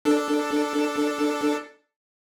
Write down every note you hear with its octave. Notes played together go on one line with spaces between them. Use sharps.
D4 A4